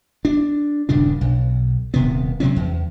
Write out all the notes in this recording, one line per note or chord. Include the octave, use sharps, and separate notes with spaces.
D4
D#1 G2 C#3 D4
B1
D#1 C3 B3
C3 F#3 C4 C#4
E2